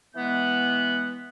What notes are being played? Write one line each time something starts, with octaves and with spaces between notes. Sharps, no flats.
E3 G#3 B3 F#6